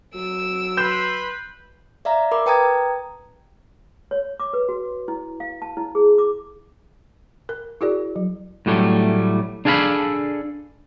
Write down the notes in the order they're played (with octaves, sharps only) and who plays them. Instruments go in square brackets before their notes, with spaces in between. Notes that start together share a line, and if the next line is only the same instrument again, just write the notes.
[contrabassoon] F#3 [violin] E6 D7
[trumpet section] B4 B5 C6 [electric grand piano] G6 E7
[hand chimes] D5 E5 F5 A#5
A#4 B5 D6
B4 G5 A5 A#5 D#6 G#6
[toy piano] C#5
D6
B4
F#4
E4
F5
A5
E4
G#4
D6
[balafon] A#4
E4 F#4 G#4 A#4 D5
F#3
[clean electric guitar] A2 F#3 G3 A3
D4 G#4 A4 F5 A5 B5